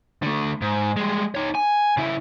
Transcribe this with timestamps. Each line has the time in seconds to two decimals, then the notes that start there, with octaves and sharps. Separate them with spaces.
0.23 D3 A3
0.62 G#2
0.97 G3 G#3
1.35 D#4 C#5
1.55 G#5
1.97 C#3 E4